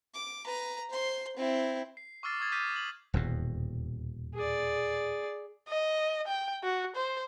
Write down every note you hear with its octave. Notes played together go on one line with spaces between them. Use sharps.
D6
B4 A#5
C5 C6
C4 E4
C7
C#6 D6 E6 F6 A6 C7
C#6 D#6 G#6 A6
D6 F6 G6 B6 C7 D#7
F#7
D#1 E2 B2
G#4 D5
D#5
G5
F#4
C5